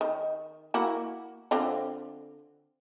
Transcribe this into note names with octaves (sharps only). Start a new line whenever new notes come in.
D#3
A#3 E4 F#4
D3 C4 F4